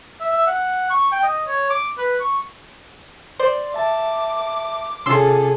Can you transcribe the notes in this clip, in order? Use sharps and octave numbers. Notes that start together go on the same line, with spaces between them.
E5
E5
F#5
C#6
G5
D#5
C#5
D6
B4
C#6
C5 D5 C6
E5 A5 D6
C3 C#4 F4 G#4 A4 C6 E6 C7